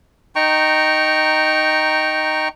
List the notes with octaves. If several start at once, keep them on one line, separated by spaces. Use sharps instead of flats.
D#4 G5 A#5 C#6